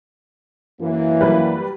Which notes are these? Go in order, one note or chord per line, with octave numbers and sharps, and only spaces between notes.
F#2 E3 A#3
F#3 G3 B4